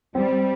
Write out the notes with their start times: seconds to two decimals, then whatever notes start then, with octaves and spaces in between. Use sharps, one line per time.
0.14 G3 C4